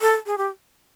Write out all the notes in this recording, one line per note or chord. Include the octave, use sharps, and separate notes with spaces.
A4
G#4
G4